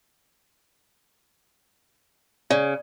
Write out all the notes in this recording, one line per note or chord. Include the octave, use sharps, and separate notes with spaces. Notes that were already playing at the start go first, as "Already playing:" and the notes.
C#3 D5